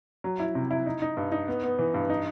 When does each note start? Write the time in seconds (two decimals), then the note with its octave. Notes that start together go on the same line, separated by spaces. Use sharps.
0.24 F#3
0.40 E4
0.55 C3
0.71 E4
0.86 D#4
1.02 D#4
1.17 G2
1.32 D#4
1.48 B3
1.63 B3
1.79 E3
1.94 G2
2.10 D#4